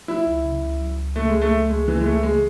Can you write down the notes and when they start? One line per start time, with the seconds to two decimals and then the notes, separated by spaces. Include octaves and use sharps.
0.08 F#3 E4
0.26 C#2
0.44 C#3
0.62 C#2
0.81 F#3
0.98 C#2
1.16 C#3 A3
1.29 G#3
1.34 C#2
1.42 A3
1.52 F#3
1.69 C#2 G#3
1.88 C#3 E3
2.00 G#3
2.05 C#2 A3
2.23 E3 G#3